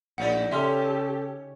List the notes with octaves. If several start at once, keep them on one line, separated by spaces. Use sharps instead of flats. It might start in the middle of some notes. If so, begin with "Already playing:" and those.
A#1 A2 D#4 E4 D5 F#5
C#3 C#4 G4 A4 E5 C6 F6